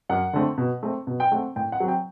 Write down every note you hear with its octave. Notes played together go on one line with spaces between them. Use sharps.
F#2 F#5
D3 A3 C4
B2
A3 C4
B2
G5
A3 C4 F#5
A2 G5
F#5
F#3 C4
G5